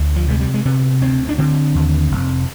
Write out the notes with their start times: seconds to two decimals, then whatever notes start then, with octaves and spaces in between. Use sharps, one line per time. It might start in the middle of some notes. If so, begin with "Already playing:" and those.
Already playing: D2
0.16 F3
0.28 C3 G#3
0.41 G3
0.54 G#3
0.65 C3 B3
1.01 D2 C4
1.29 D4
1.38 D3 C4
1.75 D#2
2.11 F1